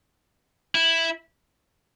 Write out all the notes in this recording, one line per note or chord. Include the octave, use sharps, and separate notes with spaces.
E4